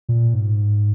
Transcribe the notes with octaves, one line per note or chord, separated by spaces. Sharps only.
A#2
G#2